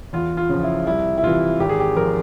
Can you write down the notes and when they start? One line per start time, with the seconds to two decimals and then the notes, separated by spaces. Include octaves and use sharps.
0.13 E2 F4
0.37 F4
0.49 C#3 F3
0.63 E4
0.87 C2 E4
1.18 E4
1.23 C3 E3 F4
1.60 G#1 G4
1.69 G#4
1.80 G4
1.96 F3 A#4